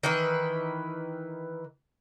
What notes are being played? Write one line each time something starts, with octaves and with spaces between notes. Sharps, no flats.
D#3 E3 B4